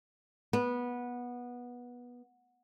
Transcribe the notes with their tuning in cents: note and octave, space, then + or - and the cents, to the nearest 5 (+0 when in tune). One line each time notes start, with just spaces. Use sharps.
B3 -15